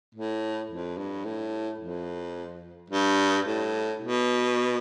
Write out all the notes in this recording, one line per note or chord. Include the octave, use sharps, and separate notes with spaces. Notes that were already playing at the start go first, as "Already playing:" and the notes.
A2
F2
G2
A2
F2
G2
A2
B2